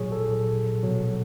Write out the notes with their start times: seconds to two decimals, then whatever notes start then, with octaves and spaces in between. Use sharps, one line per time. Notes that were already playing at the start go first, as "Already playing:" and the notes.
Already playing: A#2 F#3 G#4 C#5
0.12 A4
0.83 B2 F#3